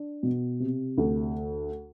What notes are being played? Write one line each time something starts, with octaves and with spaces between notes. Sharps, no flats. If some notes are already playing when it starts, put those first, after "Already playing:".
Already playing: D4
B2
C3
D2